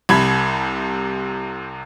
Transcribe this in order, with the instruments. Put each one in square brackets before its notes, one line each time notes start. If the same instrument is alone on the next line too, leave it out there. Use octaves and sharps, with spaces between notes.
[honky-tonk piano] C2 C3 B5 G#6